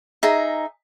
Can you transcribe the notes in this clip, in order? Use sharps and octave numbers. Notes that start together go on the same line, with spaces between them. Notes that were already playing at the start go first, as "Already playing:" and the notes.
D#4 G#4 E5 A#5